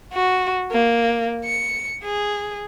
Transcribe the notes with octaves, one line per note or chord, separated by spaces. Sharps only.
F#4
A#3
C#7
G#4